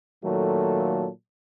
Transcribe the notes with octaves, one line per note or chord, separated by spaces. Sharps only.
A#2 D#3 F#3 A3 A#3 A4